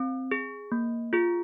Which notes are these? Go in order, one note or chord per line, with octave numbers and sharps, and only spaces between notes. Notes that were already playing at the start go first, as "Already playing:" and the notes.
Already playing: C4
G#4
A#3
F4 G#4